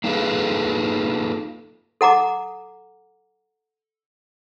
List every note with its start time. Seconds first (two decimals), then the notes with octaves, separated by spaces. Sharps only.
0.04 A#3 D#4 F4 G#4 A4 B4
2.01 A4 F#5 A#5 D6